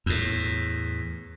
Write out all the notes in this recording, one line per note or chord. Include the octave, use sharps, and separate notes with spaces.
E2 A2